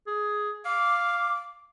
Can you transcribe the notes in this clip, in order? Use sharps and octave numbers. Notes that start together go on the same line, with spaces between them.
G#4
F5 D6